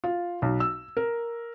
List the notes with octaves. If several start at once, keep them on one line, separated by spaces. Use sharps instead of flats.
F4
B1
E6
A#4